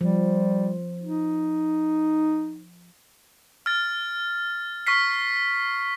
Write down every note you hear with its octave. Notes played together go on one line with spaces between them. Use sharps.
F3 G3
D#4
F6 A6
C#6 F6 B6 C7